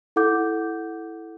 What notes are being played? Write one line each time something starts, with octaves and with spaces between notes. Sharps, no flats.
E4 A4 F#5 D6 G6